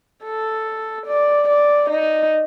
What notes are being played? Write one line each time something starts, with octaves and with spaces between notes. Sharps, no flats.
A4
D5
D5
D#4